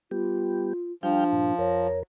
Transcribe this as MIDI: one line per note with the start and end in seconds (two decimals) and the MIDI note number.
0.11 0.73 55
0.11 0.73 59
0.11 0.92 65
0.11 0.73 67
1.03 1.87 53
1.03 1.24 55
1.03 1.54 62
1.03 1.24 77
1.03 1.24 79
1.33 1.54 43
1.33 1.54 46
1.58 2.03 41
1.58 2.03 70
1.58 1.99 73